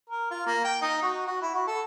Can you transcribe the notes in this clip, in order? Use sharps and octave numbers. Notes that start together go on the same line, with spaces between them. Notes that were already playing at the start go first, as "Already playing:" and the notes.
A#4
F4
A#3
G5
D#4
F#4
F#4
E4
F#4
A4